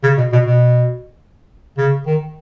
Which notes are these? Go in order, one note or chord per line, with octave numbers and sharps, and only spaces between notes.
C#3
B2
B2
B2
C#3
D#3